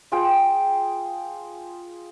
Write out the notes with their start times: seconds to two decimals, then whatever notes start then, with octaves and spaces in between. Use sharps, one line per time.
0.12 F4 G#4 G5